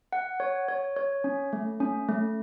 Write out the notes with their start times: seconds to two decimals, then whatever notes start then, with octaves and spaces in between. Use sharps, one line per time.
0.13 F#5
0.40 C#5
0.68 C#5
0.96 C#5
1.24 C#4
1.53 A3
1.80 C#4
2.09 A3